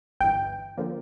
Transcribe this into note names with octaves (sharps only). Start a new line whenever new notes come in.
G1 G2 E3 G5
D3 F3 A#3